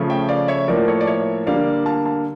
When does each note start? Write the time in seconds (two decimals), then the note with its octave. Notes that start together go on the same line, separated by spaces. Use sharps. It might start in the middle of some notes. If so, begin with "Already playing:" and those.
Already playing: C#3 F3 A3
0.10 E5 G5
0.29 D5 F5
0.48 C#5 E5
0.68 A2 F3 A#3 A#4 D5
0.88 A4 C#5
1.01 D5
1.07 C#5 E5
1.46 D3 G3 A#3 D5 F5
1.86 F5 A5
2.05 F5 A5